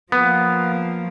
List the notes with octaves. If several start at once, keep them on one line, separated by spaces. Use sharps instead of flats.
F3 A#3 B3